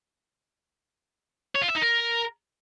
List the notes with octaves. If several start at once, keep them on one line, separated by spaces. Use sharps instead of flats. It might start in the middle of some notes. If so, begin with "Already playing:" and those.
C#5
F4
E5
D#4
A#4